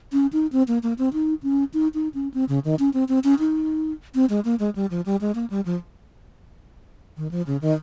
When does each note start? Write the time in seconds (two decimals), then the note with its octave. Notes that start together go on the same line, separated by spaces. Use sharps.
0.13 C#4
0.33 D#4
0.52 C4
0.68 A#3
0.83 A#3
0.98 C4
1.13 D#4
1.43 C#4
1.74 D#4
1.94 D#4
2.14 C#4
2.34 C4
2.49 C#3
2.65 D#3
2.79 C#4
2.94 C4
3.09 C4
3.24 C#4
3.39 D#4
4.15 C4
4.29 G#3
4.45 A#3
4.59 G#3
4.75 G3
4.90 F3
5.06 G3
5.21 G#3
5.35 A#3
5.50 G3
5.66 F3
7.17 D#3
7.31 F3
7.47 C#3
7.61 D#3